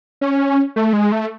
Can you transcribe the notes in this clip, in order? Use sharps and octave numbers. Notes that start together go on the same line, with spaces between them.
C#4
A3
G#3
A3